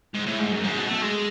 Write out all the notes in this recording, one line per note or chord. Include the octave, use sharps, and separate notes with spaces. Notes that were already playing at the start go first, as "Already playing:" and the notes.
G#2
A2
G#2
F#2
G#2
B2
A3
G#3